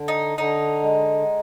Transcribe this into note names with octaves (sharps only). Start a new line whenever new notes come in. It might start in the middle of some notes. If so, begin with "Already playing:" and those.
Already playing: D3
D#4
D3 D#4
G#3